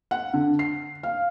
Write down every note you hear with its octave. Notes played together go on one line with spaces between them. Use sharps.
F#5
D3
C7
F5